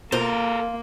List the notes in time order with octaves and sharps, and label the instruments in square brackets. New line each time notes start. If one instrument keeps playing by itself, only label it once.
[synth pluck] B2 C5 [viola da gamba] A#3 [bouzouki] F4 [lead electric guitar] A4 A#4